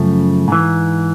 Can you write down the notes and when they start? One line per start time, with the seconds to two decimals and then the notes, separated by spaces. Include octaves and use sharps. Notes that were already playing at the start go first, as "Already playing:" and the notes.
Already playing: F#2 C#3 F3 A3
0.48 G#2 E3